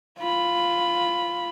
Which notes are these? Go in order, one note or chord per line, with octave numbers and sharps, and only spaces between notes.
F4 B5